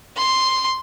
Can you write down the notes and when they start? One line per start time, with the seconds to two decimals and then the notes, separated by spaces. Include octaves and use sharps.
0.17 C6